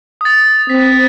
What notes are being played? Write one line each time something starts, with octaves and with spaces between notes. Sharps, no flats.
D#6 A6
C4 B6